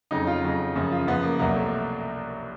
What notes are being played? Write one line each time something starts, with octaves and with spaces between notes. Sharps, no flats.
F2 C#3 F#3 D#4
F4
F2 C#3 F#3
F#2 C#3 F3
F4
F#2 C#3 F3 B3
A#3
C2 B2 F#3 A#3
A3